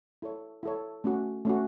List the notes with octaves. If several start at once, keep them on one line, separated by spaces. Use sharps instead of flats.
E4 A4 C#5
E4 A4 C#5
A3 C#4 F#4
A3 C#4 F#4